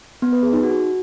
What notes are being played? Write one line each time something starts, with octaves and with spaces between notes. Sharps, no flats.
B3
B4
G#4
D#4
F#4